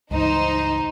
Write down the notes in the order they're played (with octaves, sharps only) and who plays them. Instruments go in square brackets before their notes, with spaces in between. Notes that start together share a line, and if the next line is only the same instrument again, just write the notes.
[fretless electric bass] C#2 G2 E3 [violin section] D#4 C5